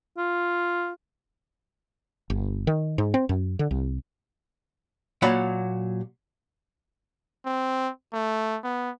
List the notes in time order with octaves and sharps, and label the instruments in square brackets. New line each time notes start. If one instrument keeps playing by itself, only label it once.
[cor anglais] F4
[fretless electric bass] G1
D#3
G#2
C4
F#2
D3
C2
[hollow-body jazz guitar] A#2 F#3 C#5 D5 F#5 B5
[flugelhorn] C4
A3
B3